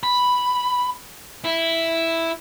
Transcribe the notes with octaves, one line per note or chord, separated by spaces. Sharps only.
B5
E4